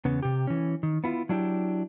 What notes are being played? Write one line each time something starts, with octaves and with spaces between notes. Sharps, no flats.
E2 C#3 B3
C3 G4
E3 C#4
D#3
B3 E4 F4
F#3 D4 E4 F#4 G4